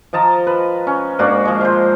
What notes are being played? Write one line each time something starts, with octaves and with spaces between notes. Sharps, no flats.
F3 D#5 A5 A#5
B4
C#4
G#2 A#3 D4 F#4
F3 G#3
F3 C5